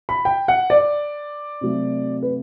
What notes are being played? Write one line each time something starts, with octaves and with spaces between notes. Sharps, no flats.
B5
G5
F#5
D5
C3 F#3 A3
B4